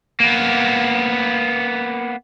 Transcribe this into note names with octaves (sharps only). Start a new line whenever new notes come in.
A#3 B3